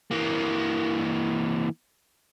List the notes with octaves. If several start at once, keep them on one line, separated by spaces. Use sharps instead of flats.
E3 A#3